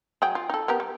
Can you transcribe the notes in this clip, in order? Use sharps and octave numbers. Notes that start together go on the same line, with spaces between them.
F#3 G#4 G5
F4
D#4 A4
B3 G4 A#4
G3